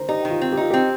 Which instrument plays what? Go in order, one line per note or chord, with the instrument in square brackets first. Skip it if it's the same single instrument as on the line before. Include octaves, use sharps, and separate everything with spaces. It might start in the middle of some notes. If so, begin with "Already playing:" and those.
Already playing: [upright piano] C5 A#5
[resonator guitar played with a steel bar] D#4 [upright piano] G4
[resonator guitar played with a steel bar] D#3
[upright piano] F4
[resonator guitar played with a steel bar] C4
[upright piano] G4
[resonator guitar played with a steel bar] D#4 [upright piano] F4
[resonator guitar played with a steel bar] C4 [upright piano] G4